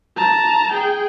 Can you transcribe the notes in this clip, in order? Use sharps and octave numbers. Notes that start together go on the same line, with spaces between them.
A5 A#5
G#4 G5